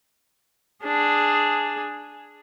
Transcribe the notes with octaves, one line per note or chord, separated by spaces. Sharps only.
D4 G#4